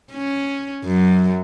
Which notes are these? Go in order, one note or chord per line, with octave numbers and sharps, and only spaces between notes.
C#4
F#2